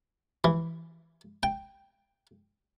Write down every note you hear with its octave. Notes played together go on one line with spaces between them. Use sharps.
E3
G5